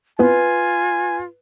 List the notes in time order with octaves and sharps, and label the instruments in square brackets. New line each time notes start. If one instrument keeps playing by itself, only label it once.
[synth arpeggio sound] B3 C4 E4 [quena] F4 [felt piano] B4 [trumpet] G#5